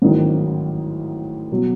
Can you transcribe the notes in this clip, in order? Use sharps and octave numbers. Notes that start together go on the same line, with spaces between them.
A1 G#2 D#3 F#3
B2 F#3